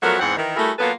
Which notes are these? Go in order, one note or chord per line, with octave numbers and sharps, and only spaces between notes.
F3 F#3 A3 B3 F#4 A#4
E2 G#2 C4 F#5
D#3 E3
G3 A3 E4 F#4 G#4 A#4
F#3 A#3 B3 F4 A4 B4